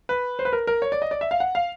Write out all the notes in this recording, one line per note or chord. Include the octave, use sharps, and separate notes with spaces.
B4
C5
B4
A#4
A#4
C#5
D5
D#5
D5
E5
F5
F#5
F5